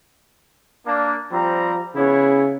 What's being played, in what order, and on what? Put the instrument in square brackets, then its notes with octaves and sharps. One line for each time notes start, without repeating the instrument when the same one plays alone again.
[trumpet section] A#3 D4
[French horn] F3 [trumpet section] G3 C4 A#5
[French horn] C#3 [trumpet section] B3 E4 C#5